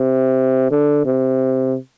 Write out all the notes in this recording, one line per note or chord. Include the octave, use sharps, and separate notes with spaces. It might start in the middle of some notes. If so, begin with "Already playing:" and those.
Already playing: C3
D3
C3